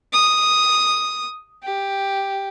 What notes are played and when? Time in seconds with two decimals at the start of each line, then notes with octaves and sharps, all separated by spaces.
0.13 D#6
1.63 G4